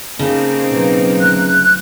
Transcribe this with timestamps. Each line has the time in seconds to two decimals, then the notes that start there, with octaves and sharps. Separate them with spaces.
0.19 C#3 A#3 C4 D#4 A5
0.70 B2 F#3
1.21 G1 A3 F#6